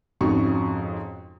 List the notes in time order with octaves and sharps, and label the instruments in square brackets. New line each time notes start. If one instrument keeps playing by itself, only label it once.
[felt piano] F2 G#2 C#3 F#4 C#6